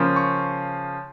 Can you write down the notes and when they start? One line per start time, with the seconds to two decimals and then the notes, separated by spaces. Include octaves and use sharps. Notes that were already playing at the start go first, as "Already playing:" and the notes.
Already playing: C#3 F3 A#3 C#4
0.16 C#6